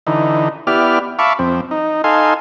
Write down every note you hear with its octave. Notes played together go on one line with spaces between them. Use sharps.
D3 E3 D#4
B3 E4 G4 D5 F6
E5 F5 A5 B5 C#6 D6
F2 C4
D#4
D#4 A4 F5 G#5 C6